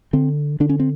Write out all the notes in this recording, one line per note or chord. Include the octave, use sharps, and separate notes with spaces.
D3 C4
D3 D4
C#4
C4